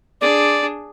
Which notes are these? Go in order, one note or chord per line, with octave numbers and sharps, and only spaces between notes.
D4 G#4 D5